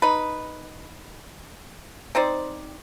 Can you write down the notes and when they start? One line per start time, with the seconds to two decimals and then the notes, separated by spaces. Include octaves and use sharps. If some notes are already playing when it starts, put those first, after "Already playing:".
0.02 D#4 B4
2.15 C4 D#4 C5 D5